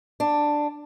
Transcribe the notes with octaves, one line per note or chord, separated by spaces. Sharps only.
D4